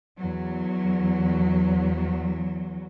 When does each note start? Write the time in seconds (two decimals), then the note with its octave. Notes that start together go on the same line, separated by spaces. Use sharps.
0.18 E2 F#3